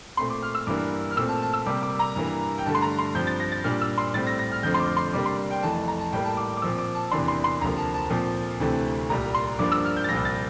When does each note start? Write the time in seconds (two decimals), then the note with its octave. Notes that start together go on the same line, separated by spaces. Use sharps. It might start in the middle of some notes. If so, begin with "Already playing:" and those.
0.17 A#2 A3 C4 C6
0.30 D6
0.42 F6
0.55 E6
0.67 G2 E3 A#3 D4 D6
1.11 F6
1.16 A#2 A3 C4 E6
1.28 A5
1.42 A5
1.53 E6
1.66 C3 G3 A#3 D6
1.83 D6
1.99 A#5
2.16 G2 E3 A#3
2.58 G5
2.66 G2 D3 A3 A5
2.75 C6
2.82 A#5
2.99 C6
3.15 G2 F3 C4 G6
3.27 A6
3.40 A#6
3.52 A6
3.64 A#2 G3 D4 F6
3.81 E6
3.98 C6
4.14 A2 G3 C4 A6
4.27 A#6
4.39 A#6
4.52 F6
4.63 F2 D3 F3 A3 C4 G6
4.74 C6
4.80 D6
4.97 C6
5.13 C3 G3 A#3 D4 D6
5.26 C6
5.50 G5
5.63 F2 E3 A3 A5
5.88 A#5
6.00 A5
6.12 A2 G3 A#3 G5
6.25 A5
6.37 D6
6.57 D6
6.62 A#2 F3 C4 E6
6.78 D6
6.95 A5
7.11 E2 C3 E3 A#3 D4 C6
7.28 C6
7.44 C6
7.61 D2 C3 F3 A#3 A#5
7.77 A5
7.94 A5
8.10 A#2 F3 C4
8.60 D2 C3 E3 A3 C4
9.10 C2 A#2 G3 A#5
9.34 C6
9.59 G2 F3 A#3 D4 D6
9.72 E6
9.84 F6
9.96 G6
10.04 A6
10.09 C2 A#2 F3 A#6
10.25 A6